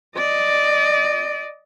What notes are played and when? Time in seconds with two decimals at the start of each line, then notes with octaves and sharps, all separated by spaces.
0.17 D5 D#5